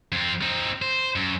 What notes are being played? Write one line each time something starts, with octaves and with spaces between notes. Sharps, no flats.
F2 C4
C4 D#4
C5
F#2